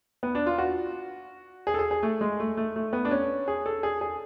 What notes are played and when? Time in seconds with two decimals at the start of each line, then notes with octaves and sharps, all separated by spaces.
0.23 B3
0.35 D4
0.46 F4
0.58 F#4
1.67 G#4
1.74 A4
1.79 G#4
1.91 G#4
2.03 A3
2.21 G#3
2.40 A3
2.57 A3
2.76 A3
2.93 B3
3.05 D4
3.11 C#4
3.48 G#4
3.66 A4
3.83 G#4
4.01 G#4